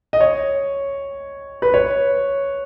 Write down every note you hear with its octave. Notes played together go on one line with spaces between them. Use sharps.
D#5
C#5
B4
C#5